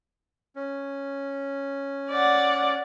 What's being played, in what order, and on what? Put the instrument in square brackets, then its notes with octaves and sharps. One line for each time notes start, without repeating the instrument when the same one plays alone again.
[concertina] C#4
[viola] D5 F#5